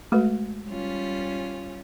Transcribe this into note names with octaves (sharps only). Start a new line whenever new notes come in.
G#3 A3 F#4 B4
G3 C#4 F4